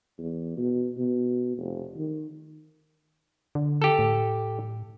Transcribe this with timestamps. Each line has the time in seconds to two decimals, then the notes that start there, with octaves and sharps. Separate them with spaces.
0.18 E2
0.57 B2
0.98 B2
1.58 F1
1.97 D#3
3.55 D3
3.82 G4 A4
3.99 A2